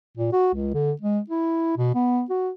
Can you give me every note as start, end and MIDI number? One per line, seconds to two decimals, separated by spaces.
0.17 0.32 46
0.33 0.50 66
0.54 0.72 37
0.74 0.92 50
1.01 1.19 56
1.30 1.73 64
1.77 1.90 47
1.95 2.23 59
2.30 2.50 66